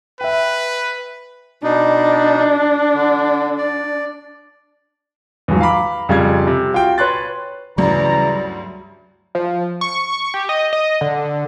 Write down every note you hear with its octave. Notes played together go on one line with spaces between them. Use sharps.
B4 E5 G5
B2 D4 D#4
D3
D5
E2 G#2 F3 F#3
F5 A#5 B5 D6
F2 C#3 G3 F4 F5 G#6
C3
F4 F#4 G5
B4 C#5 C6 F#6 A6
D2 G2 C#3 E3 F#3 D5 A#5
F3
C#6
G4
D#5
D#5
D3